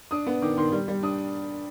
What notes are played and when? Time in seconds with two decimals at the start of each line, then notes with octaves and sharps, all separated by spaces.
0.11 D4 D#6
0.26 B3
0.42 D#3 D6
0.57 D#3 C6
0.72 G3
0.88 G3
1.03 D4 D#6